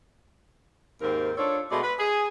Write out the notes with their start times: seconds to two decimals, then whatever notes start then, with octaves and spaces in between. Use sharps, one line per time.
1.01 D#2 G#2 C4 A#4
1.37 D4 F4 A4 C#5
1.70 B2 G#3 A3 F#4 D5
1.83 B4
1.99 G#4